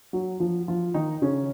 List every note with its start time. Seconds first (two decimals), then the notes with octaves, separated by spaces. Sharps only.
0.13 F#3 F#4
0.40 F3 F4
0.68 F3 F4
0.94 D#3 D#4
1.22 C#3 C#4